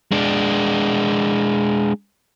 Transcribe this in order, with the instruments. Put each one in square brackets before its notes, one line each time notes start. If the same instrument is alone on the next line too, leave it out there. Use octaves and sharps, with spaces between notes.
[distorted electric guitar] G#3 D4